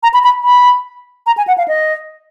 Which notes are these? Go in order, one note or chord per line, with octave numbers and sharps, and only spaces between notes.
A#5
B5
B5
B5
A#5
G#5
F#5
F5
D#5